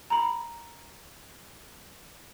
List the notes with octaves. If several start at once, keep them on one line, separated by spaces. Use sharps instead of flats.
A#5 B5